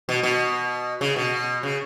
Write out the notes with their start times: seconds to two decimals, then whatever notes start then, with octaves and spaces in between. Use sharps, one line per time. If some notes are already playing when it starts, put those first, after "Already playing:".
0.09 B2
0.23 B2
1.01 C#3
1.16 B2
1.63 C#3